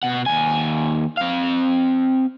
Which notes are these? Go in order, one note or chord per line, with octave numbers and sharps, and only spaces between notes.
B2 F#5
D#2 G#5
C4 F5